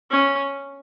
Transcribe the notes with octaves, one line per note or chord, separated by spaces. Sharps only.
C#4